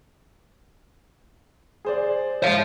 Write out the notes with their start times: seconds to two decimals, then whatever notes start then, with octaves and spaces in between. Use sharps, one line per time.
1.85 G#4 C5 D5
2.42 G#2 C5 E5 F5